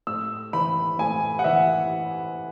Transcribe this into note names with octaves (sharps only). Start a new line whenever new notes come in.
A2 E6
E3 B5
A2 G#5
F#5
E3 E5